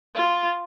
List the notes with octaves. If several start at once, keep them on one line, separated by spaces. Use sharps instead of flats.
F4